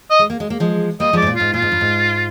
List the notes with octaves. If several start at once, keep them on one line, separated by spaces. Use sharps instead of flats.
D#5
G#3
A#3
G#3
A#3
F3 G#3
G3 A#3 D#5
F3 G#3 D5
G#2
A#2
G#2 F4
A#2 F4
G#2
G2
G#2